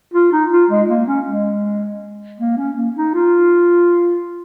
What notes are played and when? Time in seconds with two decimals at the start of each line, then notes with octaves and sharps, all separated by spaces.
0.14 F4
0.32 D#4
0.52 F4
0.71 G#3
0.89 A#3
1.08 C#4
1.26 G#3
2.40 A#3
2.58 C#4
2.77 A#3
2.96 D#4
3.14 F4